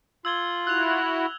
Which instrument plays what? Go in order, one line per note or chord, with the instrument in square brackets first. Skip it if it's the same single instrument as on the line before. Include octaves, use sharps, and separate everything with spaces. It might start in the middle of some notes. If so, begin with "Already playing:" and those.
[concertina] F4 [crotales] E6 G#6 G7
[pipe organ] E4 F#4 [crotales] E6 F7 [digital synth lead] F#6